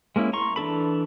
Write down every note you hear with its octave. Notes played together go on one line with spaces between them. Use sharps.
G#3 A#3 C#4 E4
A#5 C6 C#6
E3 D4 A4 B5